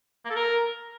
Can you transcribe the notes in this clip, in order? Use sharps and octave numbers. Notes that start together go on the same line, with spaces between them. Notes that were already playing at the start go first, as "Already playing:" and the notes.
A#3
A4
A#4